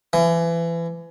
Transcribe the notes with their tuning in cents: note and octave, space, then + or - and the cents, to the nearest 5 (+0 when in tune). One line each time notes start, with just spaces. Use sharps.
E3 +30